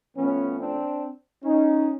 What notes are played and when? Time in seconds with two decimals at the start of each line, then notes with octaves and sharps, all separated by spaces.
0.15 A2 F3 A3 B3 C#4
0.58 C4 D4
1.44 C#4 D#4